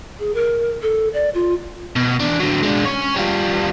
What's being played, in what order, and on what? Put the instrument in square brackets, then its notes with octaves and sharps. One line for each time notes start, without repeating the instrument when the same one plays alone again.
[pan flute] G#4
A#4
A4
D5
F4
[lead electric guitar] B2
E2 D4
D3 F#3
G#3 D4
C#4 C#5
G3 F4